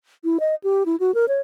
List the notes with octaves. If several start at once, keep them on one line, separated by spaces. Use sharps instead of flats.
E4
D#5
G4
E4
F#4
A#4
C#5